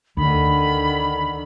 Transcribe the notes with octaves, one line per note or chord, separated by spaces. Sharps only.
D2 D3 D#3 B5